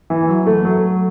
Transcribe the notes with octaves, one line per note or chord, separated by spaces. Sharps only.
E3
F#3
A3
F#3